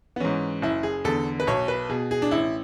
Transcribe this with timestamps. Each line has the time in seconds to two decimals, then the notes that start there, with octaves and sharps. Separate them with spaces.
0.16 B3
0.20 G#2 E3 C#4
0.62 F#1 E4
0.83 G#4
1.04 E2 D3 A4
1.40 B4
1.47 B1 C#5
1.68 B4
1.89 B2 G#4
2.11 G#4
2.22 D4
2.31 A1 E4